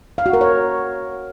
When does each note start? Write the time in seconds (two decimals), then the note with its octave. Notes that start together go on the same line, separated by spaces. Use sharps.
0.18 F5
0.26 F#4
0.33 A#4
0.41 C#5